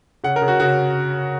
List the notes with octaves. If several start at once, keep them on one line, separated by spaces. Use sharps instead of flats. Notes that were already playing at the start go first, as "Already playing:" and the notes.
C#3 F#5
A#4
C#3
F#4
C#3 F#4